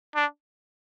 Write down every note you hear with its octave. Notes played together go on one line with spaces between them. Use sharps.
D4